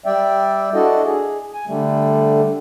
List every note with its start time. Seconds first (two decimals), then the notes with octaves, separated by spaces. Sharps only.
0.06 G3 D5 E5 G5
0.74 D4 E4 F#4 A4 D5 D#5
1.04 G#4
1.53 G#5
1.67 D3 G3 A3